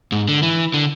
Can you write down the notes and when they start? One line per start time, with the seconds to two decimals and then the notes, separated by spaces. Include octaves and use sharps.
0.12 G#2
0.28 D3
0.43 E3
0.74 D3